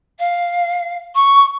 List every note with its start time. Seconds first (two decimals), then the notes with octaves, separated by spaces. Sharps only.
0.19 F5
1.15 C#6